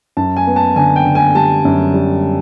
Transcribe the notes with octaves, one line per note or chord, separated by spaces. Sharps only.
F#2 A5
G#5
B3
A5
D3 G#5
G5
D3
G#5
G3 A5
F#2
G3